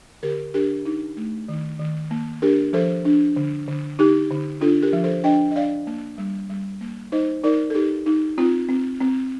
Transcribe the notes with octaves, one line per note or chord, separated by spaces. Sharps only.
D3 G4 A#4
D4 G4 A#4
D#4
A3
D#3
D#3
A#3
D4 G4 A#4
F3 A4 C5
D4
D3
D3
D#4 G4
D3
D4 F4 A4
G4 A#4
F3
A4 C5
D4 D#5 G5
D#5
D4 D5 F5
A#3
G3
G3
A#3
D#4 C5 D#5
D#4 A#4 D5
A4
D#4 G4
D#4
C4 F4
C4
C4